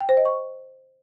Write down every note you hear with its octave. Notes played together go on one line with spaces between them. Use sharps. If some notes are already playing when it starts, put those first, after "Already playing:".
G5
C5
D#5
C#6